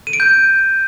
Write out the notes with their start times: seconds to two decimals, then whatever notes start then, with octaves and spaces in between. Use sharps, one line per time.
0.07 D#7
0.13 D7
0.20 G6